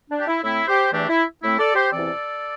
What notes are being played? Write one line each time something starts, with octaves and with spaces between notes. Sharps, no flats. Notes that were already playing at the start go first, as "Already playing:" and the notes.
D4
G4
E4
A2 A3 C4 E4
G4 C5
E2 E3 A3 C4 D4 G4
E4
A2 A3 C4 E4
A4 D5
G4 C5
E2 C3 E3 C4 A4 D5